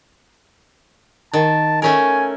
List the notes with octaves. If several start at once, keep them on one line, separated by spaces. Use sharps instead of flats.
D#3 A5
A3 C#4 A#4 G#5